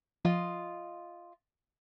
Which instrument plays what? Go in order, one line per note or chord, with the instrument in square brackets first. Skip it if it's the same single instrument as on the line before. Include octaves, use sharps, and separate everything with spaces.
[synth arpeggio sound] F3 [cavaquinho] F4 D#5 C6